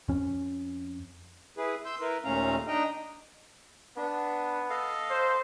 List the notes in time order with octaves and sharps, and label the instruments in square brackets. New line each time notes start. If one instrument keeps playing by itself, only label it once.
[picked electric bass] F2 C#4
[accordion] E4 G#4 B4
C6 E6 G6
E4 A#4 B4
D#2 A#2 A3 C#4 F5 A#5
D4 D#4 D#5 G5 A#5
[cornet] B3 [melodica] D4
[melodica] A4 D#5 F5
[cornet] C5